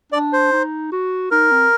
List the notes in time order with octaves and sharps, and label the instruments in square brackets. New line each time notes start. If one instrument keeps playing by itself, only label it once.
[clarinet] D4 [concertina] D5
[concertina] C5
[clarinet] D#4
F#4
[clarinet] D#4 [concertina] A#4
[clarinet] C4